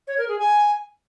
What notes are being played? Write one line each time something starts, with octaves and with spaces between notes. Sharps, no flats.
C#5
A#4
G#4
G#5